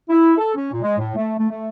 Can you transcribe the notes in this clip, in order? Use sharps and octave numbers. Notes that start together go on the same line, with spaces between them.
E4
A4
C#4
A#2
G#3
A2
A3
A3
A3